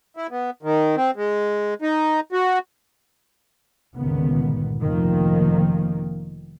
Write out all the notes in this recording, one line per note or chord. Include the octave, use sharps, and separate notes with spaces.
E4
B3
D#3
C4
G#3
D#4
F#4
G1 C#2 A#2 D#3 B3
F1 D#3 F3 A#3